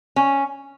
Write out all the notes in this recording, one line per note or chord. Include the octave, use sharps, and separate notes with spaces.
C#4